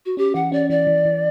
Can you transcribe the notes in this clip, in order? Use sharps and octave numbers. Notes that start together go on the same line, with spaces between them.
F#4
C#4 G4
E3 F#5
C#4 D5
E3 D5
E3
E3